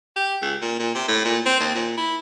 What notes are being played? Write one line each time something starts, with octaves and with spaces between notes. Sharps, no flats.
G4
C#2
A#2
A#2
C3
A2
A#2
C4
D#2
A#2
E4